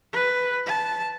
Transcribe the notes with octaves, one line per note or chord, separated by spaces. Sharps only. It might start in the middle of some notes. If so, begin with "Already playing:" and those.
B4
A5